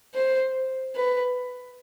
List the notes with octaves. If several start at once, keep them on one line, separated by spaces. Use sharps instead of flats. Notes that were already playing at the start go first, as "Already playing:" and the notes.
C5
B4